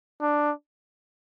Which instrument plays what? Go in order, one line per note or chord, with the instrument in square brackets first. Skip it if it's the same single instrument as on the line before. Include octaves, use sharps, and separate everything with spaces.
[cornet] D4